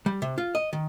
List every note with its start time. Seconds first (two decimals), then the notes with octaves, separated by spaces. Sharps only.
0.06 G3
0.22 C3
0.38 F4
0.55 D#5
0.73 D#3